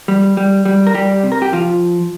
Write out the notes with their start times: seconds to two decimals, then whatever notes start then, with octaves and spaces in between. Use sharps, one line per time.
0.08 G3
0.37 G3
0.65 G3
0.87 A#4
0.94 G3 G4
1.23 C3
1.32 A#4
1.42 G4
1.53 F3 F4